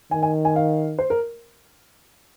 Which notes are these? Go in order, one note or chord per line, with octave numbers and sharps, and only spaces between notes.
D#3 G#5
G#5
G#5
F5
C5
A#4